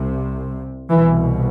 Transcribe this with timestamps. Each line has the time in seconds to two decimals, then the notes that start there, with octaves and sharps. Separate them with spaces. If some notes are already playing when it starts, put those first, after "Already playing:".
Already playing: C2 C3
0.90 C2 B2 E3